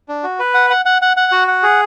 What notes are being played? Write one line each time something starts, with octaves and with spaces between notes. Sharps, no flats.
D4
F#4
B4
F#5
F#5
F#5
F#5
F#5
F#4
F#5
G#4